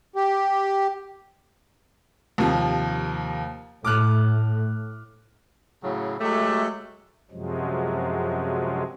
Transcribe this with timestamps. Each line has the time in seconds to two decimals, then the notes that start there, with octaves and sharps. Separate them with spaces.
0.16 G4
2.38 D#2 C3 F3
3.85 A2 D6 F6 F#6
5.83 A2 C#3 F#3
6.20 F#3 G#3 A3 G4 E5
7.31 F#2 C3 F3 F#3 G#3